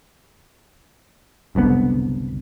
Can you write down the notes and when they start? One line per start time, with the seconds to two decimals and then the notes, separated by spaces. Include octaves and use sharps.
1.55 F#1 C2 D3 B3